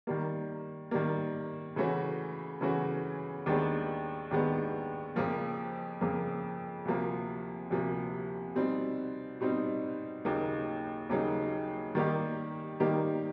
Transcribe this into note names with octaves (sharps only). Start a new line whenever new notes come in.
D#3 G3 A#3
D#3 G3 A#3
C#3 E3 A3 C#4 F#4
C#3 E3 A3 C#4 F#4
D#2 D#3 G#3 B3 D4
D#2 D#3 G#3 B3 D4
F2 C#3 F3 A#3
F2 C#3 F3 A#3
D2 C3 F3 A#3
D2 C3 F3 A#3
B2 G3 C4 D#4
B2 G3 C4 D#4
D#2 C#3 F#3 A#3 D#4
D#2 C#3 F#3 A#3 D#4
D#3 G3 A#3 D#4 G4
D#3 G3 A#3 D#4 G4